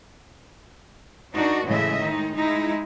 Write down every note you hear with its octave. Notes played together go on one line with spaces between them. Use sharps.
D4 D#4 F#4 A#4
A2 C#3 E3 G#3 D#5 E5
D#3 G#3 D#4
G#3 D#4 E4